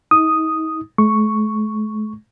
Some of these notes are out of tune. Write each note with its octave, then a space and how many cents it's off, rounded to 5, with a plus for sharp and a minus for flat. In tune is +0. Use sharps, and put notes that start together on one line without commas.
D#4 +40 D#6 +0
A3 -45 C#6 +0